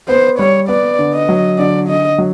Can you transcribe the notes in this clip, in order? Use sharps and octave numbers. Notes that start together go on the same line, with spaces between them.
B3 C5
G3 C#5
B3 D5
D3
D#5
F#3
D3 D5
D3 D#5
F#3